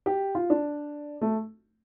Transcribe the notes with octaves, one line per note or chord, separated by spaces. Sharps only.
G4
F4
D4
A3